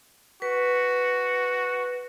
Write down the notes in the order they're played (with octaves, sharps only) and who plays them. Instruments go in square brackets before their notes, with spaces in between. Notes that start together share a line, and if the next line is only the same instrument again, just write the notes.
[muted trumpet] F#4 [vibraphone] B4